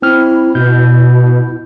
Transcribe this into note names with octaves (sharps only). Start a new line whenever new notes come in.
C4 E4 F6
B2 E4 G6